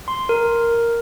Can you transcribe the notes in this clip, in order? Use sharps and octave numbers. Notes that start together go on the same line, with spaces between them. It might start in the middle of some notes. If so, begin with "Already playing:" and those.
C6
A#4